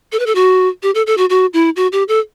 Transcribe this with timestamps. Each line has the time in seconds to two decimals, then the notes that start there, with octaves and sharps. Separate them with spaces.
0.12 A4
0.19 B4
0.26 A4
0.35 F#4
0.83 G4
0.95 A4
1.07 A4
1.17 F#4
1.30 F#4
1.53 E4
1.76 F#4
1.92 G4
2.08 A4